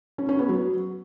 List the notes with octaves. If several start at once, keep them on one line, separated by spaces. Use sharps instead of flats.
C#4
C#4
B3
F#3